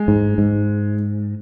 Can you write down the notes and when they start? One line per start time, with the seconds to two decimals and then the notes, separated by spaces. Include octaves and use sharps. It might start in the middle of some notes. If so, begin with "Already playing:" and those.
Already playing: G#3
0.08 G#2
0.38 G#2